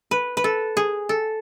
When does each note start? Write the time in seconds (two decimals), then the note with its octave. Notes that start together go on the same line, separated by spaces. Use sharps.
0.11 B4
0.37 B4
0.44 A4
0.77 G#4
1.09 A4